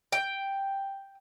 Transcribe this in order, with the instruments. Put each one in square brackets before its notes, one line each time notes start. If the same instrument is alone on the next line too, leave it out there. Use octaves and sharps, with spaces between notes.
[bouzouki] G5